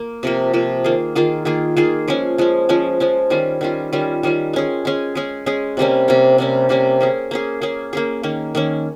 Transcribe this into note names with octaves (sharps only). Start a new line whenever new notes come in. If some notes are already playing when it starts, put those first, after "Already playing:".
Already playing: A#3
C3 F3 A#3
C3 F3 A#3
D#3 A#3 F4 G#4
D#3 A#3 F4 G#4
D#3 A#3 F4 G#4
D#3 A#3 F4 G#4
F3 G#3 C#4
F3 G#3 C#4
F3 G#3 C#4
F3 G#3 C#4
D#3 G3 C#4 F4
D#3 G3 C#4 F4
D#3 G3 C#4 F4
D#3 G3 C#4 F4
G#3 C#4 G#4
G#3 C#4 G#4
G#3 C#4 G#4
G#3 C#4 G#4
C3 G3 A#3 C#4
C3 G3 A#3 C#4
C3 G3 A#3 C#4
C3 G3 A#3 C#4
A#3 C#4 G#4
A#3 C#4 G#4
A#3 C#4 G#4
A#3 C#4 G#4
D#3 A#3 C#4
D#3 A#3 C#4